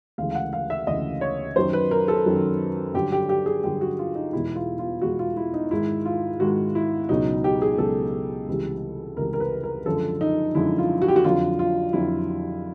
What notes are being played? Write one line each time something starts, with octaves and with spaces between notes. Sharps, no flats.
D2 C#3 E3 G#3 F5
F5
F#5
F5
E5
D2 C#3 E3 G#3 D#5
C#5
F#2 D#3 F#3 C5
B4
A#4
A4
F#2 D#3 F#3
G2 D3 F#3 G4
G4
G4
G#4
G2 D3 F#3 G4
F#4
F4
D#4
E2 B2 G#3 E4
F4
F4
E2 B2 G#3 F#4
F4
E4
D#4
G#2 D#3 G#3 E4
F4
G#2 D#3 G#3 F#4
E4
C#2 B2 F#3 D#4
G4
G#4
C#2 B2 F#3 A4
C#2 C3 E3 G3
C#2 C3 E3 G3 A#4
A#4
B4
A#4
F#2 D3 F3 G#3 A4
D#4
F#2 D3 F3 G#3 E4
F4
F#4
G4
F#4
F2 D3 F#3 F4
F4
F2 D3 F#3 E4